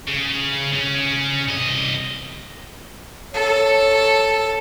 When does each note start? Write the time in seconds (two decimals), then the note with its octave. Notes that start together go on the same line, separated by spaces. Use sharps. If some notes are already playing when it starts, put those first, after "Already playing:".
0.07 C#3
0.72 C#3 C#4
1.49 C2 D#5
3.34 A4 C#5